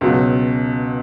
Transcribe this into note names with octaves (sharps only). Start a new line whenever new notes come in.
C#2 B2 F#3